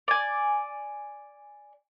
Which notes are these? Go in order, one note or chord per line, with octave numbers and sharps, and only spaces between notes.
D5 G#5